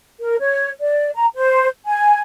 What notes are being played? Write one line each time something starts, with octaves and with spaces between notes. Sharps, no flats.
A#4
C#5
D5
A#5
C5
G#5